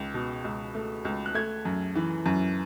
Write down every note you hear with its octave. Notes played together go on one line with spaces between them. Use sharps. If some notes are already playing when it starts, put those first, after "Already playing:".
Already playing: C#2
B2
C#2
A3
C#2
F#6
A3 G#6
F#2
E3
F#2